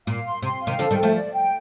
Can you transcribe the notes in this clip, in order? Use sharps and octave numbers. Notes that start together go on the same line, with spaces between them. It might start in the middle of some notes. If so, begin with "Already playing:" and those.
A#2 F5
C6
C3 C6
F5
C3 D#3
D3 F3 A4
D#3 G3
A4
F3 A3
D5
G5